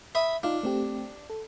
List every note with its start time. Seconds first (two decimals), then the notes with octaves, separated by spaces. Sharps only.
0.15 E5 B5 D#6
0.43 D4 D#4 F4 F5
0.63 A3 C4 G4
1.30 A4